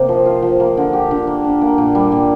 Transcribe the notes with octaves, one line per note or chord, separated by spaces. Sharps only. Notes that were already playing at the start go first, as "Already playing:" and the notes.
Already playing: C3 A#3 G4
F3
F4
F3
A#3
D3
G4
D3
A#3
D4
A#3
A#2
G3
A#2